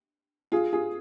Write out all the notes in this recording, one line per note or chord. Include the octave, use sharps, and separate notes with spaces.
F4 G#4
F4 G#4